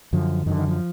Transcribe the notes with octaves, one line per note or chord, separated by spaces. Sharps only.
F#2 D3 F3
F#2 D3 D#3
D#3
F3